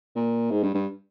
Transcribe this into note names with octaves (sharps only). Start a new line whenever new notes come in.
A#2
G#2
G2
G2